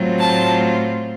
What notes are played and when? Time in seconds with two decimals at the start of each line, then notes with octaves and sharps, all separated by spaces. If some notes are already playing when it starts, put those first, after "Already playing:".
Already playing: A2 F#3 A3 C4 F4
0.20 A5